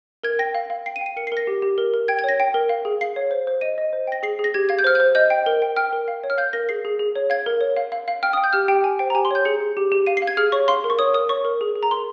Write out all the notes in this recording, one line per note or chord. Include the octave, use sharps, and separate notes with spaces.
A#4 G#6
G5 A#6
F5
F5
G5 C7
D#7
G5
D#7
A#4 C#7
C7
A#4 A#6
G4
G4
A#4
A#4
G5 G#6
G#6
C#5 A#6
G5
A#4
F5
G#4
F5 C7
C#5
C5
C5
D#5 D#7
D#5
C5
G5 A#6
G#4 C7
G#4
A#6
G4 G#6
F5 G#6
G6
C5 F6
C5 G6
D#5 G6
G5
A#4
G5
G5 F6
A#4
F5
C#5
F6
F5 G6
A#4 A#6
G#4 C7
G#4
G#4
C#5
F5 G#6
A#4
C#5
F5
F5
F5
G5 F6
G5 D#6
G6
G4 F6
G4 G5
G5 G#5
C5 G5
A#5
G4 G#5
C6
C#5 G6
G#4 C#7
G#4
G4
G4
F5 D#7
C7
F5
G#6
G#4 F6
C#5 C#6
F5 C6
A#4
C#6
C#5 D#6
A#4 D#6
C#5 C#6
A#4
G#4
G#4
A#5
A#4 C6